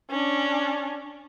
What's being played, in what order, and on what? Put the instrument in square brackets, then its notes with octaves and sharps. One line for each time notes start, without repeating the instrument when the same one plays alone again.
[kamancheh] C#4 D4